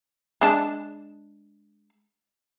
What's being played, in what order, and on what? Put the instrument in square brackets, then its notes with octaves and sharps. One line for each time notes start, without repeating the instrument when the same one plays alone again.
[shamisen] G#3 D4 A5